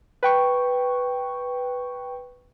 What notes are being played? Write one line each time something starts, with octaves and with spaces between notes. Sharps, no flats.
B4 G5 C#6